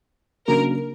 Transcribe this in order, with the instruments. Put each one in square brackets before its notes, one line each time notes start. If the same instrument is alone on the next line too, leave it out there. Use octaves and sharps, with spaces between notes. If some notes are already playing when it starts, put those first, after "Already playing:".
[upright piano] C#3 F#3 A#3 D4 [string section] A#4